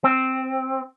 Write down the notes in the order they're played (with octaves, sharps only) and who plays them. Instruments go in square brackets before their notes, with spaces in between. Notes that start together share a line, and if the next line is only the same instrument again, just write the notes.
[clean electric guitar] C4